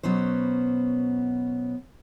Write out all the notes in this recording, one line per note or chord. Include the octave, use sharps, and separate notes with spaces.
B2 F#3 B3 C#4 C5